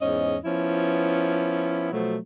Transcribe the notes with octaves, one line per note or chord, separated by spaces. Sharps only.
E2 G#2 C#4 D#5
F3 B3 C#4 E4
B2 F3 F#3 A3